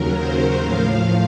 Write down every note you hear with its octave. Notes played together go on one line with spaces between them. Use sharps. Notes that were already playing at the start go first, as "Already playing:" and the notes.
Already playing: D#2 C#3 F#3 A#4
C5
A2 F3 F5